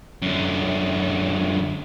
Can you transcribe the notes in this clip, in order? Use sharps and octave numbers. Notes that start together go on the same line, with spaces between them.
F#2 D3